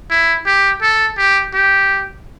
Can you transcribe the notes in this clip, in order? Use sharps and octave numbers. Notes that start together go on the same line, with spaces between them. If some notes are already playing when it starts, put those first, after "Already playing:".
E4
G4
A4
G4
G4